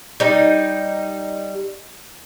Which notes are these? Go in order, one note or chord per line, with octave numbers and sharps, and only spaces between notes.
G3 D#4